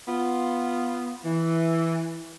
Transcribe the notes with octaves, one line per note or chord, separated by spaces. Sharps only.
B3 F4
E3